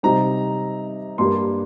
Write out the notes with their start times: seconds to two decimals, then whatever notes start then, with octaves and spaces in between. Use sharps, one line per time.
0.03 C3 G3 C4 D#4 A#5
1.18 G2 G3 A#3 C6